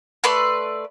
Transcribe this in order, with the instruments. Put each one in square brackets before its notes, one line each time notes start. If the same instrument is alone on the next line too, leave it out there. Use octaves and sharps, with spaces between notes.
[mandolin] A3 B4 D5 C6